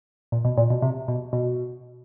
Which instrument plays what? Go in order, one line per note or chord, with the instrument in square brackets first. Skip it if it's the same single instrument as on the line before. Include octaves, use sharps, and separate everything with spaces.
[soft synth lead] A#2
B2
A#2
B2
C3
B2
B2